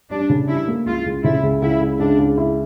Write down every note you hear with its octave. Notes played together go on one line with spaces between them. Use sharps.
G3 D4
C#3
G3 E4
A#3
C#2 F4
C#2
C#3 E4
C#2
C#2 E4
C#2
C#2 D4
C#2
E4